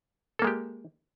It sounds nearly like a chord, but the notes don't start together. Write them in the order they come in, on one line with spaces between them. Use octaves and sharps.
A4 A#3 G#3 G4